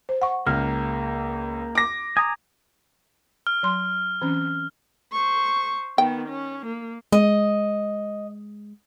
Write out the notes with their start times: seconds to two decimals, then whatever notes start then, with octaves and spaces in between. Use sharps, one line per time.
0.09 C5
0.22 F#5 C#6
0.47 C#2 A#3 F6
1.75 D6 A#6
2.17 G#5 A#5 D#6
3.47 F6
3.63 F#3 C6
4.22 E3 C4 C#4
5.12 C5 C#6
5.98 D#3 B3 G5
6.28 C#4
6.66 A#3
7.12 G#3 D#5